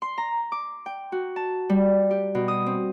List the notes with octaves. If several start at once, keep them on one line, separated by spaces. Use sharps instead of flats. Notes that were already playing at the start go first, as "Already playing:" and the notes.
C6
A#5
D6
G5
F#4
A5
G3
G4
B2
D#6
C4